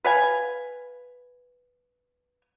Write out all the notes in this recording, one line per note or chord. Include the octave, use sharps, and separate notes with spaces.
B4 F5 G#5